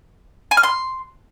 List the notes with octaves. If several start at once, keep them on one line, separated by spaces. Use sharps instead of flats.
G#5
F6
C6